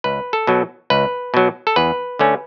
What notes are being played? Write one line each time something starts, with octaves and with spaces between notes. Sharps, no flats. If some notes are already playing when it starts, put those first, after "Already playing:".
C#2 B4
A4
B2 F#3
C#2 B4
B2 F#3
A4
E2 B4
D3 A3 C#4